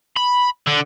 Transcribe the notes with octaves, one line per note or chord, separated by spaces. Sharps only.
B5
D3